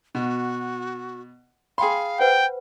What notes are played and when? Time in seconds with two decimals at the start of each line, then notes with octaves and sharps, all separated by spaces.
0.15 B2 F#4
1.78 G#4 F5 G5 B5 C6
2.19 B4 C5 F#5 G5